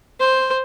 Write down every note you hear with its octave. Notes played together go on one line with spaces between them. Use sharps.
C5